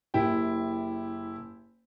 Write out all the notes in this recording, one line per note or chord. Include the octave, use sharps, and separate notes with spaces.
F#1 E4 G4 G5